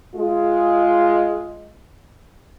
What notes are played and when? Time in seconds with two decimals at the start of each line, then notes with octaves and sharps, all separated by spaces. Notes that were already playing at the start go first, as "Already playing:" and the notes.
0.15 G#3 F4